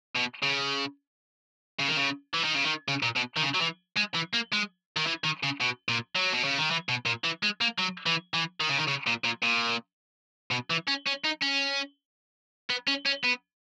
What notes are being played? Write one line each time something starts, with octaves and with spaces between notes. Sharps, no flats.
B2
C#3
C#3
D#3
C#3
E3
D#3
C#3
D#3
C#3
A#2
B2
D#3
C#3
F#3
E3
G#3
E3
A#3
G#3
D#3
E3
D#3
C#3
B2
A#2
F#3
B2
C#3
D#3
E3
B2
A#2
E3
G#3
A#3
F#3
E3
E3
D#3
C#3
D#3
C#3
A#2
A#2
A#2
B2
E3
C#4
C#4
D#4
C#4
B3
C#4
C#4
B3